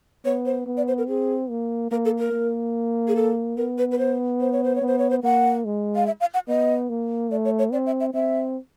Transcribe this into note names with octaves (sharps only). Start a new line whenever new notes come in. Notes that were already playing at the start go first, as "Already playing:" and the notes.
B3 C#5
C5
B3
D5
C5
A#4
C4 G#4
A#3
A#3 A#4
A4
A#4
A#3
G#4
A4
B3 A#4
B4
B4
C5
C5
C#5
C5
C#5
B3
C5
C#5
C5
A#3 F#5
G#3
F5
E5
F5
F#5
B3 D#5
A#3
A3 D5
C#5
C#5
C4 D5
E5
E5
C4 E5